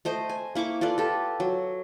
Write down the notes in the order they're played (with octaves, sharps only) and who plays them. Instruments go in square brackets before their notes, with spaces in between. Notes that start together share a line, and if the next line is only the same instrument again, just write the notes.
[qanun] A3 C5 D#5
G#5
A#3 E4 C#6 D6
F4 A4 B4 D5
G4 A4
F#3